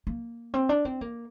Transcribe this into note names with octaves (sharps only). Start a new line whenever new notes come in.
A#3
C4
D4
C4
A#3